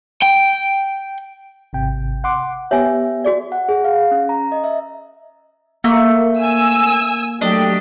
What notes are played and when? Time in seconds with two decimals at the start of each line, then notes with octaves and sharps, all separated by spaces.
0.22 G5
1.73 G#1 C3 G5
2.24 F#5 C6 D6
2.71 B3 G4 C#5 E5 G#5
3.24 F#4 G#4 D5
3.52 F#5
3.69 G#4
3.84 F5
4.11 C#4
4.29 A#5
4.52 D#5
4.64 E5
5.84 A3 A#3
6.40 G#5 E6
7.41 F#3 A3 D4 G4 D#5